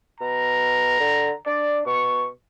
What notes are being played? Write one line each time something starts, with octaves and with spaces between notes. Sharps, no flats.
B2 A#5
D3
D4 D5
B2 C#6